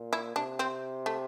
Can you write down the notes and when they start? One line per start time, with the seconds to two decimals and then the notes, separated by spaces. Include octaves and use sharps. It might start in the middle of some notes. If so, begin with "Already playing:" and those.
Already playing: A#2
0.13 E4
0.35 C3 D4
0.59 C4
1.06 A3